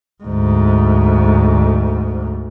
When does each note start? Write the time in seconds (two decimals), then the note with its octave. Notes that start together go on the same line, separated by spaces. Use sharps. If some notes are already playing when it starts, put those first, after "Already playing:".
0.24 D2 G#2